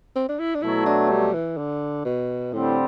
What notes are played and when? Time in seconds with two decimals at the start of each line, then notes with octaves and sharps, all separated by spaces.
0.16 C4
0.29 D4
0.40 E4
0.55 D4
0.62 B2 F#3 A3 E4
0.86 D4
1.10 G3
1.34 E3
1.58 D3
2.06 B2
2.53 A2 D3 G3 C4